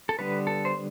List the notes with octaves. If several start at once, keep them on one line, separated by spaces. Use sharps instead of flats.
A4
D3 G3 B3 B4
A4
C5